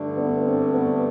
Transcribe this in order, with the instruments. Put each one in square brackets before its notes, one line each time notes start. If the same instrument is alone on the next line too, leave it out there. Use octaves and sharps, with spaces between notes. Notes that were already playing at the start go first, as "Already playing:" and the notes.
Already playing: [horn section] G2 D3 A3
[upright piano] B3 D4
C4
B3